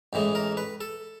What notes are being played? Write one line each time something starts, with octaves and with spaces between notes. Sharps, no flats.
A1 A2 E3 G#3
A#4
B4
A4